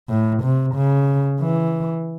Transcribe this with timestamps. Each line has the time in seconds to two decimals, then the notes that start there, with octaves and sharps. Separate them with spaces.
0.10 A2
0.43 C3
0.75 C#3
1.41 E3